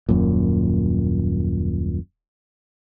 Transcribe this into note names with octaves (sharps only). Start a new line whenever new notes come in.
D#1 F#2 A#2